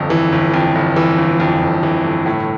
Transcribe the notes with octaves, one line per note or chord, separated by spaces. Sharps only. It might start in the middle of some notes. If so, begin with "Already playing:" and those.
Already playing: G1 F2
E3
G1
F2
G1
E3
G1
F2
G1
E3
G1
A2